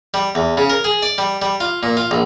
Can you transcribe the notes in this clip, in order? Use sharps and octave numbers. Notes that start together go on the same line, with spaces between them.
G3
E2
C#3
A#4
G#4
D5
G3
G3
F4
A#2
F4
A#1